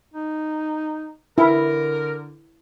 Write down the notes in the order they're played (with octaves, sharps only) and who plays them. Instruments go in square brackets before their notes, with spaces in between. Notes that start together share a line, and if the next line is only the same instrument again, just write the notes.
[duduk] D#4
[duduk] D3 [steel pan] E4 [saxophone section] A#4